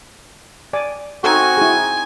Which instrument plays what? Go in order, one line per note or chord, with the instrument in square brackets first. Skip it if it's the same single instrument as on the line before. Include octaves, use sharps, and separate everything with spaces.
[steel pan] D5 G#5 D6
[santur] C4 D#4 A#5 [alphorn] F#4 [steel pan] A4 [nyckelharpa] G#5
[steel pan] E4 G#4